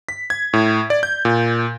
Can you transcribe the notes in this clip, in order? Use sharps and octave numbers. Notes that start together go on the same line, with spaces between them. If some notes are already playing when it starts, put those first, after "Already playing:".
B6
G#6
A2
D5
G6
A#2